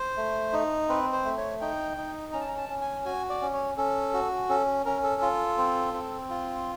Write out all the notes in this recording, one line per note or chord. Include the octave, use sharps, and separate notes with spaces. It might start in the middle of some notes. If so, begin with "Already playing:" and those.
Already playing: C5
A3
D#4
C4 B4
C5
A3
C#5
D#4 G5
D#4
C#4 A#5
A5
A#5
A5
C#4
G#5
F#4 G#5
D5
C#4
C#5
C#4 A4
F#4
C#4 A4
C#4 A#4
A4
F4
C4
C4
F4